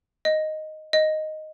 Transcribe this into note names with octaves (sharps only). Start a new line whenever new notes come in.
D#5
D#5